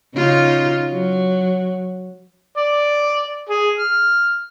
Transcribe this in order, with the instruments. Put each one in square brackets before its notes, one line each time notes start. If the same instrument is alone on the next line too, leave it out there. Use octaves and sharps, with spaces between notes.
[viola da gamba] C#3 D#4 F4
F#3
[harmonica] D5
G#4
F6